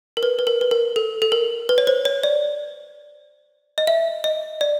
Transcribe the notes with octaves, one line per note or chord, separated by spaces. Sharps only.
A#4
B4
B4
A#4
B4
A#4
A4
A4
A#4
B4
C#5
C5
C#5
D5
D#5
E5
D#5
D5